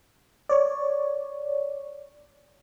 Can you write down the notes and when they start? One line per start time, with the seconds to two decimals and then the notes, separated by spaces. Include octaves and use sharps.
0.49 C#5 D5